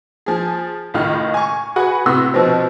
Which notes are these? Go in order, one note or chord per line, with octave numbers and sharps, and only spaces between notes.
F3 G#4
C#2 A2 D#3 F4 F6
G#5 C#6
F#4 G#4 B4 F#5 G#5
A2 C3 B3 F#4 C6 E6
B2 F3 B3 C4